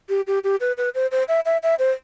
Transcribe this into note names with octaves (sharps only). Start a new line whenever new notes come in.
G4
G4
G4
B4
B4
C5
C5
E5
E5
E5
C5